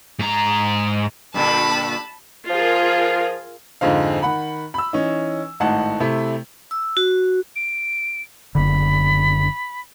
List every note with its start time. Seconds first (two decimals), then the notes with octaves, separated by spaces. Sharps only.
0.19 G#2 A#5
1.34 G2 A#2 D3 A5 B5
2.50 F3 F4 G#4 A#4
3.81 F2 G#2 D3 G#3 C4 F5
4.22 D#3 F#5 B5
4.74 B5 E6
4.93 E3 C#4 D#4
5.60 G#1 A2 D#4 F#5 A5
6.00 C3 A3 E4
6.71 E6
6.97 F#4
7.56 D7
8.55 F#1 D3 B5